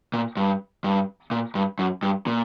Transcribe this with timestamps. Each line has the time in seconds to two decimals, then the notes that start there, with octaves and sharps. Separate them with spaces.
0.14 A#2
0.37 G2
0.84 G2
1.31 A#2
1.55 G2
1.79 F#2
2.03 G2
2.27 A#2